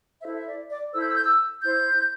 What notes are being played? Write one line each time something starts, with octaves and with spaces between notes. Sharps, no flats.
E4 A4 C5 E5
E5
D5
D5
E4 A4 C5 E6
G6
E6
G6
E6
E4 C5 G6